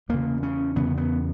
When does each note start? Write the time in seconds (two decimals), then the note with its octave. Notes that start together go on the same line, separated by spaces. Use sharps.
0.09 E2 C#3 A#3
0.43 C#4
0.76 E2 C#3 B3
0.97 B3